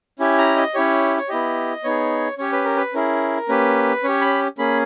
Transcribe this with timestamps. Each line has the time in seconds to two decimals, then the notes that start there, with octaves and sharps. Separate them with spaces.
0.19 C#4 E4 G4 G#5
0.38 A#5
0.56 D#5
0.75 C#4 E4 G4 C#5
1.17 C#5
1.29 B3 E4 G4 D#5
1.84 B3 D#4 G#4 C#5
2.38 C#4 G4 C#5
2.52 B4
2.65 A#4
2.76 B4
2.94 C#4 E4 G#4 A#4
3.49 A#3 C#4 G4 B4
4.04 C#4 G4 C#5
4.21 B5
4.58 A#3 C#4 G#4 B5